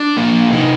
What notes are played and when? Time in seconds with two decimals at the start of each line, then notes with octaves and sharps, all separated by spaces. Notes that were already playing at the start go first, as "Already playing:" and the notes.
Already playing: D4
0.17 F3 A#3
0.52 C3 D#4